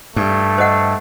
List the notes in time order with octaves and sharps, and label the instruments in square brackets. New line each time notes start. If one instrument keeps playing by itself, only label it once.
[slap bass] G2 [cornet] A3
[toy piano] C5 D#5 F#5